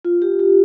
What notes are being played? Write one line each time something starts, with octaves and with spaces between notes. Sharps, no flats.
F4
G4
G4